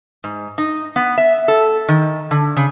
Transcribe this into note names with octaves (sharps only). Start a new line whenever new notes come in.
G#2
D#4
B3
E5
A4
D#3
D3
C#3